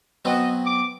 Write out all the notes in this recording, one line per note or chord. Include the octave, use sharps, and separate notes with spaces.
F#3 B3 C4 F#4 D#5
D6